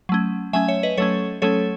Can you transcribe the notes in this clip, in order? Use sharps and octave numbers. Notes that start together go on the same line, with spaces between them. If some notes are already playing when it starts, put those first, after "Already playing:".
F#3 A3 C#4
F#3 A3 C#4 E5 G#5
C#5 E5
B4 D#5
F#3 A3 C#4 A4 C#5
F#3 A3 C#4 A4 C#5